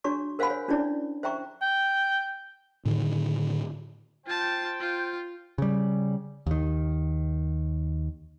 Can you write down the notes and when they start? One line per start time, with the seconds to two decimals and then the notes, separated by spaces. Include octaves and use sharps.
0.04 D4 F#4 C#5 A#5 C#6
0.39 A#4 C5 F5 F#5 G#5 B5
0.50 C#5
0.68 C#4 D4 E4 C#5 D5
1.23 C5 E5 G5 A#5 C#6
1.62 G5
2.85 A2 D3 D#3
4.26 F4 C5 G5 A5
4.80 F4
5.58 C#3 G3
6.47 D#2 D#3